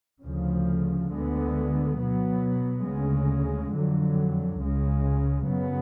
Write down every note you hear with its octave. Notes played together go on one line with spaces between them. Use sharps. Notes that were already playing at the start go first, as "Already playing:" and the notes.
D2 C#3 F3
D2 D3 G#3 B3
B2 F#3 B3
D2 C#3 G#3
F2 D3 F#3
C#2 C#3 G#3
F#2 C#3 F#3 B3